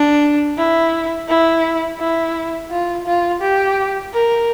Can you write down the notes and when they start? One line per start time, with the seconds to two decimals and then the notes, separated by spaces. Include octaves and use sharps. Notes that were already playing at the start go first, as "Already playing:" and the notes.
Already playing: D4
0.58 E4
1.28 E4
1.99 E4
2.70 F4
3.06 F4
3.41 G4
4.13 A#4